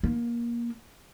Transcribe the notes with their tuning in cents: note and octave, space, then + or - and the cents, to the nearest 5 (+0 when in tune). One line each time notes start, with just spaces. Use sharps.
A#3 +20